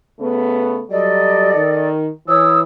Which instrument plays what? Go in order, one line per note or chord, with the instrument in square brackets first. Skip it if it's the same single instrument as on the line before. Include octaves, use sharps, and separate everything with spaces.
[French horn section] C#3 A3 B3
[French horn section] F#3 G3 [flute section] A4 D5 D#5
[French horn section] D#3
[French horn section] E3 [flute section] C#5 D#6 E6